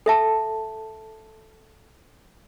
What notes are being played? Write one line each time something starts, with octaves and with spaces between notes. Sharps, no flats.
A4 E5 A5